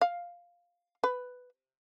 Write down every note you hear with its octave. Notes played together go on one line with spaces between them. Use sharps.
F5
B4